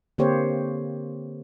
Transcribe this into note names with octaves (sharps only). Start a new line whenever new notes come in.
D3 A#3 C4 G4 C5 C#5